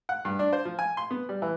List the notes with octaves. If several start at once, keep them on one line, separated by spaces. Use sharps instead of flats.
F#5
G2
D4
C5
F3
G#5
C6
B3
G3
E3